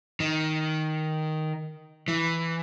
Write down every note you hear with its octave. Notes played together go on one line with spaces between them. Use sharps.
D#3
E3